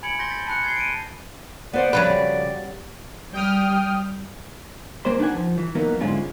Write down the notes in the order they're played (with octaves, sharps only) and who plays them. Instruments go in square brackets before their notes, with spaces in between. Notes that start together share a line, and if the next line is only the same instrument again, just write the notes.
[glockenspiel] G#5 B5 G#6 C#7 D7 F#7
C6 G6 A#6 B6 G7
A6 B6
A5 B5 F#6 C#7
G#6 A6 C7 G7
D7 D#7
[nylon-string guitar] B3 C5 F#5 [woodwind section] D5
[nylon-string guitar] F2 C#3 [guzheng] F#3 G3 B4
[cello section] G3 [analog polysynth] G5 D#6 F6
[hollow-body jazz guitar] C#2 A#3 B4 C5 C6
D4 D#4 B4 F#5 G#5
F3
E3
E3 F#3 A#3 B3 D#4
G#2 D3 G#3 C#4 E4 F4